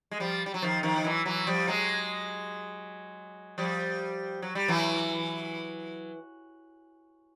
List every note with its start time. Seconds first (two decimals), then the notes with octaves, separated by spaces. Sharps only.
0.11 G#3
0.20 F3 G3
0.46 G3
0.54 F#3
0.62 D#3 F3
0.83 D#3 F3
0.96 F3
1.04 E3 F#3
1.25 E3 F#3
1.47 F3 G3
1.67 F#3 G#3
3.58 F3 G3
4.42 F#3
4.55 G3
4.68 E3 F#3